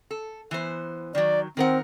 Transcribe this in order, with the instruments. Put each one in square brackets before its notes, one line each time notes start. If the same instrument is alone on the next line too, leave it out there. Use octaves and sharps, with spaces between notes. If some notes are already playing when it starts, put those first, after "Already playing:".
[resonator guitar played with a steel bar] A4
E3 B3 C5
[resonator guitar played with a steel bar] D#3 F#3 [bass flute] D5
[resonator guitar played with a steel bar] D#3 A#4 F#5 [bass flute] C4